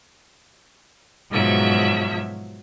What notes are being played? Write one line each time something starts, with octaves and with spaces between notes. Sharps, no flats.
G#2 B2 F3 F#3 E5